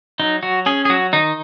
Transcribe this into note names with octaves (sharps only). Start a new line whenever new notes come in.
F#3 D#4
F#3 F#4
C#4 G#4
G#4
F#3 F#4
D#3 D#4